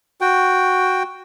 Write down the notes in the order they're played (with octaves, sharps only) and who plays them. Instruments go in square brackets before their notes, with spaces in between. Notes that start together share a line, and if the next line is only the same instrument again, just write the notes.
[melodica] F#4 G5